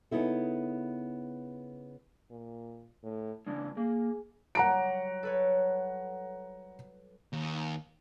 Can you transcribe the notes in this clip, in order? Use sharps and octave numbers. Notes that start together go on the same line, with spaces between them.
C#3 B3 D#4 E4 A4
A#2
A2
C#3 E3 G#3 D4
A#3 G#4
F#3 G3 F#5 A#5 D7
A4 B4 C#5
D#2